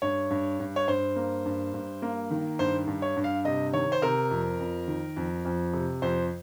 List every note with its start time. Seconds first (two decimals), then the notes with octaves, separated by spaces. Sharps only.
0.02 G2 C#5
0.30 G2
0.60 G2
0.76 C#5
0.88 G2 C5
1.16 A#3
1.45 G2
1.74 G2
2.02 A#3
2.31 D#3
2.59 G2 C5
2.87 G2
3.02 C#5
3.16 G2
3.24 F5
3.45 C3 D#5
3.73 D#3 C#5
3.92 C5
4.02 C3 A#4
4.31 F2
4.59 F2
4.88 D#3
5.17 F2
5.45 F2
5.74 C3
6.02 F2 C5